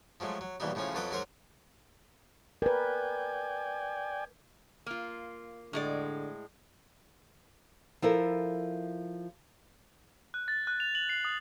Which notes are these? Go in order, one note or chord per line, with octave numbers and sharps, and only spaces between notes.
F3 F#3 G#3 A3
F#3
A#1 D#2 B2 E3 G3 D#4
A2 C#3 F3 C#4 F#4
F2 F#3 A4 B4 G5 D#6
G#2 F#3 F#4 A#4 C5 C#6
A#4 B4 D5 G5 G#5
A#3 F4
A2 D3 G#3 D5
F3 E4 A4 A#4
F#6
A6
F#6
F7
F#7
C7
D#6